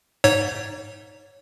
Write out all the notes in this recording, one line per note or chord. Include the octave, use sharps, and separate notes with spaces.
G#2 C#5